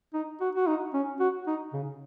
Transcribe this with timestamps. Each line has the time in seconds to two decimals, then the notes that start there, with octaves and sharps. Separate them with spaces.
0.14 D#4
0.41 F#4
0.55 F#4
0.67 D#4
0.94 C#4
1.20 F#4
1.47 D#4
1.73 C#3